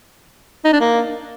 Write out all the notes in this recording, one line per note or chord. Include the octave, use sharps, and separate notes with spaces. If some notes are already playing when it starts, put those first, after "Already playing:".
D#4
D4
A#3